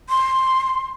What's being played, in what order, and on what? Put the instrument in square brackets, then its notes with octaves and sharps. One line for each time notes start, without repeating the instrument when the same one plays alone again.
[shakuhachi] C6